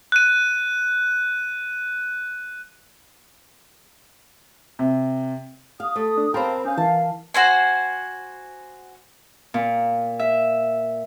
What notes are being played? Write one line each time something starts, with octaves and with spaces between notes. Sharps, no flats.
F#6 D#7
C3
F5 D#6
A3
D4
C4 A#4 F5 G5 A5 B5 C6
C#4 F5 G#5 D#6 G6
E3 A#4 F5 A5
F#4 C5 G#5
A#2
E5